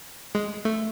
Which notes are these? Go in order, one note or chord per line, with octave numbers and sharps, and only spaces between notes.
G#3
A3